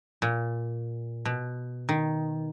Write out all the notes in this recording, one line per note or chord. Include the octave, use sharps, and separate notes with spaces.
A#2
B2
D#3